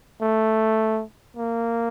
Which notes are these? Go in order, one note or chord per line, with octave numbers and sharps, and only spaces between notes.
A3
A#3